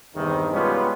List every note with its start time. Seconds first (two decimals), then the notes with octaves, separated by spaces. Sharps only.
0.16 E2 G2 C3 D#3
0.53 G3 G#3 B3 C#4 F4